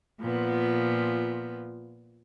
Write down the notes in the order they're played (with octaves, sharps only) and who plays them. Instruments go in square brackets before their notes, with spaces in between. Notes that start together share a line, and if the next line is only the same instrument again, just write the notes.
[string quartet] A#2 F3 B3